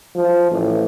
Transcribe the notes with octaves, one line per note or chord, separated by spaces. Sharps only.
F3
A1